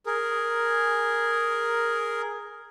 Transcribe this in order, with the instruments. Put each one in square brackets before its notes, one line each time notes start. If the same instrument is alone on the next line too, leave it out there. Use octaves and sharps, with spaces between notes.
[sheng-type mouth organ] G#4 A#4